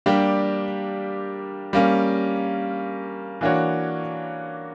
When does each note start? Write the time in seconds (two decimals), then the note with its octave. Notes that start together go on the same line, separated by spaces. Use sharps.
0.06 G3 A#3 D4 G4
1.73 G3 A#3 C#4
3.41 E3 A#3 D4 F#4 C#5